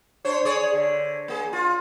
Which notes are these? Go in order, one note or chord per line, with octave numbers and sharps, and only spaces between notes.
D4 C5 C#5
G#4 C#5 D5
D3
A#3 G#4
F4